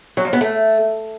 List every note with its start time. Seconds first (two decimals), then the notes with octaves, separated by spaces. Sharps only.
0.17 F#3
0.25 F2
0.33 B3
0.41 A3